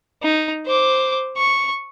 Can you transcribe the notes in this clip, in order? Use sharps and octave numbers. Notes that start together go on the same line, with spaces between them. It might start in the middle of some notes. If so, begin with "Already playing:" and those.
D#4
C5 D6
C#6